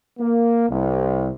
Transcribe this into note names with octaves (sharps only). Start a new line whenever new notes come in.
A#3
C2